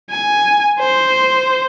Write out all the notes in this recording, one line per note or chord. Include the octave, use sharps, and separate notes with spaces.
G#5
C5